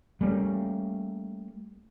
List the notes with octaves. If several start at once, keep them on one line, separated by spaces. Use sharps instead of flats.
G3 A3 A#3 C#4